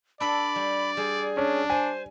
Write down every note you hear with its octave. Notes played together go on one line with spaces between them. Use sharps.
D4 A4 D5 B5
G3
G3 G#4
C#4 D4
C5 G#5